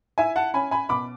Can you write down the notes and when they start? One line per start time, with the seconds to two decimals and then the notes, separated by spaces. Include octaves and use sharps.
0.18 E4 E5 G#5
0.36 F#5 A5
0.54 C#4 G#5 B5
0.71 G#5 B5
0.89 B2 B5 D6